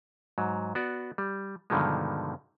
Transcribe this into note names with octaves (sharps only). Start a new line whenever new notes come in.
G#2 F#3
B3 F#4 D5
G3
G2 B2 D3 D#3 F3 G#3